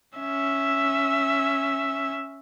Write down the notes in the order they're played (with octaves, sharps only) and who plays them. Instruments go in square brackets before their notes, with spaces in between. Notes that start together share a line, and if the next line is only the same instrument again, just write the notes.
[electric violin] C#4 E5